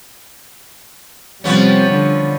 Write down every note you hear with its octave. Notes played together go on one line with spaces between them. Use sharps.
C3 F3 G3 B3 C#4
D3